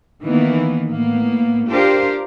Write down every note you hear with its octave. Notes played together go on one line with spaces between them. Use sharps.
D#3 E3 A#3 B3
A2 A#3 B3
D4 F4 G4 A#4 C5